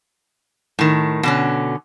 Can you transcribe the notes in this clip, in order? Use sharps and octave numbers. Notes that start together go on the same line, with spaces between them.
A2 D#3
B2 D3 C#4